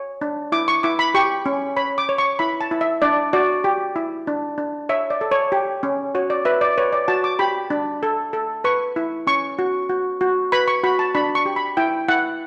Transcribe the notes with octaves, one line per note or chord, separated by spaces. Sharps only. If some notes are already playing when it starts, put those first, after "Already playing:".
Already playing: C#5
D4
E4 D6
C#6
E4 D6
B5
G4 C#6
C#4
C#5 B5
D6
C#5
C#6
E4 B5
A5
E4
E5
D4 D5
F#4 D5
G4
E4
D4
D4
C#5 E5
D5
A4
C#5
G4
C#4
F#4 C#5
D5
B4 E5
D5
B4 C#5
D5
F#4 A5
D6
G4 B5
D4
A4
A4
B4 C#6
E4
C#4 C#6
F#4
F#4
F#4
B4 B5
C#6
F#4 B5
A5
D4 B5
C#6
G4
B5
E4 G5
E4 F#5